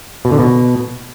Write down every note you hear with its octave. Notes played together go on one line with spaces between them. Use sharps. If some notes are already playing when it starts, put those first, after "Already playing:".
B2
D3
B2